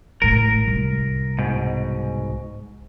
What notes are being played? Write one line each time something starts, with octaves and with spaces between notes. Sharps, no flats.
A1 A2 A#4
C2
G#2 B2